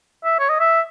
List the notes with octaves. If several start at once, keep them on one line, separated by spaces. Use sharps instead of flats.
E5
C#5
D#5
E5